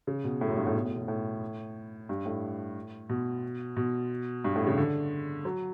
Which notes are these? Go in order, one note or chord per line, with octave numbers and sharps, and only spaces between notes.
C#3
B2
A2
F#2
G2
A2
B2
A2
B2
A2
G2
A2
B2
B2
G2
A2
C#3
D3
F#3